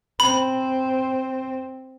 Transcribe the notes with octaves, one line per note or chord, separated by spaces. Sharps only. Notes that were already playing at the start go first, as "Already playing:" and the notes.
C4 B5